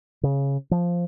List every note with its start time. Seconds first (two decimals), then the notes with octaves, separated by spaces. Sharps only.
0.23 C#3
0.71 F3